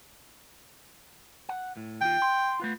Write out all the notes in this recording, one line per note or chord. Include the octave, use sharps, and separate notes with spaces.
F#5
A2
D#2 F4 G5
C6
A3 B3 F4